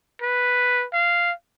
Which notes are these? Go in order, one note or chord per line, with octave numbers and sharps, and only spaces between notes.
B4
F5